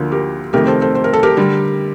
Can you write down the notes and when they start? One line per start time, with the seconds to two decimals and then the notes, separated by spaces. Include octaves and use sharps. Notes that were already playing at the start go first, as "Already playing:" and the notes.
Already playing: D2 D3 F3 A#3
0.11 G4 A#4
0.53 F2 C3 D#3 A3 G4 A#4
0.67 A4 C5
0.81 A4 C5
0.95 C5
1.04 A#4
1.13 A4
1.23 G4 A#4
1.37 D3 G3